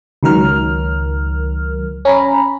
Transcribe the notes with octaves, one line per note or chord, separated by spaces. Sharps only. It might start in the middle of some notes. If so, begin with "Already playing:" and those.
C#2 D#3 F#3 A#4 F6
C#4 A#5 B5